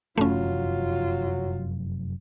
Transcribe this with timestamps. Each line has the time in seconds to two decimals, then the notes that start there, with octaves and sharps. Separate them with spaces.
0.18 F1 F#2 E3 F#3 A3 C#4 F4